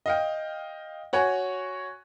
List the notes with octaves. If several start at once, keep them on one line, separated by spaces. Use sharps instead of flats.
D#5 F5 G5
F#4 C#5 F#5 G#5